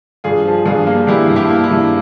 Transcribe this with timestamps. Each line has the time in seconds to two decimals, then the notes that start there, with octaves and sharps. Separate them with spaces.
0.24 G2 F4 G#4
0.45 F3
0.66 G2 F4 G#4
0.87 A#3
1.07 G2 E4 G4
1.28 G2
1.36 E4 G4
1.50 A#3
1.64 E4
1.71 G2